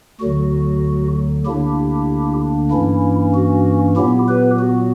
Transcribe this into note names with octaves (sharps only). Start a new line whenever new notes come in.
D2 D3 F#3 F#4
D2 D3 A#3 D4 E4 G4
G2 E3 A#3 C#4 E4
F#4
A#2 F#3 B3 E4 G4
G4 B4
F#4